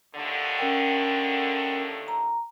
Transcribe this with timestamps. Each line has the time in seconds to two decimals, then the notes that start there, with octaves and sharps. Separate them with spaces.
0.15 D#2 A2 D3
0.58 C#4 A#4 G5
2.08 A#5